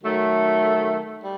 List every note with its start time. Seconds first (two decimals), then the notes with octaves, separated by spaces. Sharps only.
0.03 D#3 F#3 A3
1.21 G3